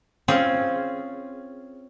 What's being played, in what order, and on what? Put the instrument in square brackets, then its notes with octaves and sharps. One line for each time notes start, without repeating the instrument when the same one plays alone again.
[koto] C4 C#4 F4 G#4